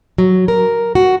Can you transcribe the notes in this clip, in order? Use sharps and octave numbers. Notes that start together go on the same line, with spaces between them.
F#3
A#4
F#4